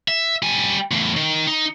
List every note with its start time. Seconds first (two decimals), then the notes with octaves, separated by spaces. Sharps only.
0.08 E5
0.43 G3 G#5
0.91 E2 A2
1.16 D#3
1.47 D#4